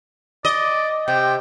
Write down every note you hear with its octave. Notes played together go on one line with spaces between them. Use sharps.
D5 D#5
C3 G5